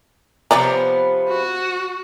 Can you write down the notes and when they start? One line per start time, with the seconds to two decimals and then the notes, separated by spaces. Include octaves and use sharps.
0.51 C3 F3 B3 C#5 D5 A#5
1.28 F#4